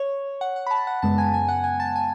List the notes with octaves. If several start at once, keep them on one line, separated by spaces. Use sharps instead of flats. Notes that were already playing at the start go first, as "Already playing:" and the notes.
Already playing: C#5
F#5
F#5
B5
A5
F#5
F#2 C#3 G#3 B3 A5
G#5
G#5
F#5
G#5
A5
G#5